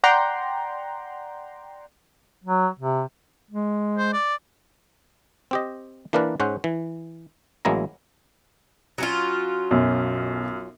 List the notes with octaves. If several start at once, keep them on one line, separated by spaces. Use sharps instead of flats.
D5 F#5 G5 A#5 C6
F#3
C3
G#3
C5
D5
C4 G4 D#5
E3 A#3 D4 A#4 B4 D5
G#2 C#4 C5 F#5
E3
A1 F#3 G#3 A#3 E4 A#5
F#3 C#4 F4
B1 F#2